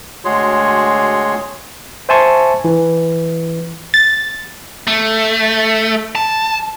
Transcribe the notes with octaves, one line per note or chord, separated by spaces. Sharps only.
D2 G#3 F#4 G#4 C#5 C6
C5 E5 G#5 A5 C6 C#6
E3
A6
A3
A5